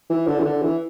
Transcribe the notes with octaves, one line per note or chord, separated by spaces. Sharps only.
E3
D3
E3
D3
E3